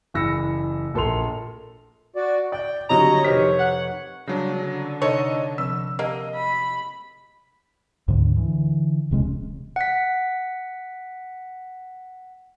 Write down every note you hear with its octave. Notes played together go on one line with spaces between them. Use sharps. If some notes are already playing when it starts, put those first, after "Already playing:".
F#1 E3 B5 E6 A#6 C#7
A#1 A4 A#4 C6 F7
F#4 D5
D5 G5
D3 F#3 G3 C#5 D#5 A#5
F1 C3 D#3 G4 B6
F#5
C#3 F#3 G3 D4 D5 A#6
D3
C3 D#4 A4 C#5 D#5 C6
C3 F3 C4 E6
A#3 G4 D#5 F#5 A5
B5
D2 G#2 D3
D3 E3
D1 C3 G#3 C#4
F#5 B6